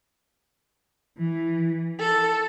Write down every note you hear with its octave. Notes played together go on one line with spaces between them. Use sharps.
E3
A4